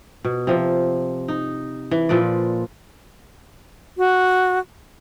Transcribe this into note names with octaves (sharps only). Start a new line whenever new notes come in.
B2
C3 F3
D#4
E3
A#2 F3 B4 D5
F#4